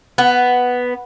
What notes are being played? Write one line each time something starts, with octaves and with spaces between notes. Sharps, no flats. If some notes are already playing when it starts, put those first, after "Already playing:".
B3